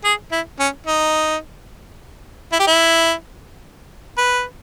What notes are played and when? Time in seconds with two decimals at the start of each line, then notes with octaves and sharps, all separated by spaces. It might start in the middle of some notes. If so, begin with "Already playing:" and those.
0.04 G#4
0.32 E4
0.59 C#4
0.86 D#4
2.53 E4
2.60 G4
2.67 E4
4.18 B4